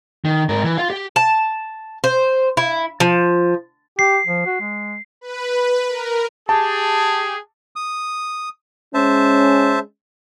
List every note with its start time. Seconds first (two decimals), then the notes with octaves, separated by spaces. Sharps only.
0.25 D#3
0.49 G#2 A#4
0.64 E3
0.78 F4 F5
0.90 G4
1.16 A5
2.04 C5
2.57 E4
3.00 F3
3.99 G4 C7
4.26 F3
4.46 F#4
4.60 G#3
5.21 B4
5.88 A#4
6.49 G4 G#4 A5
7.76 D#6
8.94 G#3 C#4 C5 E5 A5